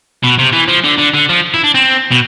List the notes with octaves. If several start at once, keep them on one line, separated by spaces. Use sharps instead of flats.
B2
C3
E3
F3
D3
D3
D3
F3
E4
D4
C4
B2